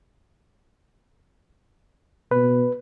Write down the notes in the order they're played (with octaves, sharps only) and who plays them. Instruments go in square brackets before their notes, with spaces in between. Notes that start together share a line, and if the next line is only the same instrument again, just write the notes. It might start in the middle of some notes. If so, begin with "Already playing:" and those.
[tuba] B2 [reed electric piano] B4